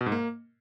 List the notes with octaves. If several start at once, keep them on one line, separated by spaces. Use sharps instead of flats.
B2
G#2
A#3